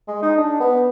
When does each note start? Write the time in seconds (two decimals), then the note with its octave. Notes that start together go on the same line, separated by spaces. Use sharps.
0.08 G#3
0.22 D#4
0.37 D4
0.60 B3